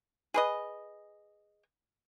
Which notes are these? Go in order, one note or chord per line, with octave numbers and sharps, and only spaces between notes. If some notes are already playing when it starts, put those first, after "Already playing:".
G#4 B4 D#5